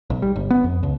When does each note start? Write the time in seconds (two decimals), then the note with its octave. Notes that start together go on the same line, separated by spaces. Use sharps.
0.10 B1
0.22 G3
0.36 G1
0.51 B3
0.64 F2
0.83 C#2